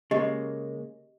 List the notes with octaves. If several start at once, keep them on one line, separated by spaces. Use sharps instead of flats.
C#3 G#3 A#3 G4 D#5